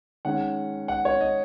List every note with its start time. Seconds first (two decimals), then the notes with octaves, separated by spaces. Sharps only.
0.25 D#3 G#3 C#4 F#5
0.88 F#5
1.05 C#5
1.21 D#5